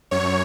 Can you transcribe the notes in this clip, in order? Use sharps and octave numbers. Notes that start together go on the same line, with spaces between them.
F#2 C#5